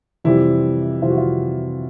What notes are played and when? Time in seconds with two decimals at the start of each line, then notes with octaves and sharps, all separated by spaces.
0.24 F2 C3 E3 G3 E4
1.02 F2 C3 E3 G3 F4
1.10 F#4
1.17 F4